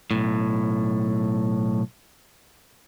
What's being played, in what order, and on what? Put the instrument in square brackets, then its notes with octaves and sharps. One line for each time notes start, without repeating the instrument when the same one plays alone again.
[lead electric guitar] B1 A2